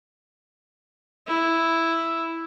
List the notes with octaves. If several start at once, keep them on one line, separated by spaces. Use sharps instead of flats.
E4